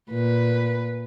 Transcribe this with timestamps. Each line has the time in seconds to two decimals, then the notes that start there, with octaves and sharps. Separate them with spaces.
0.10 A#2 B4